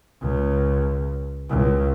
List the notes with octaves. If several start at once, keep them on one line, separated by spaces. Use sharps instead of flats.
C#2
C#2